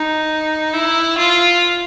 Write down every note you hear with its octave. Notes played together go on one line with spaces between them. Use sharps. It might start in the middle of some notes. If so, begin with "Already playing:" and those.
Already playing: D#4
E4
F4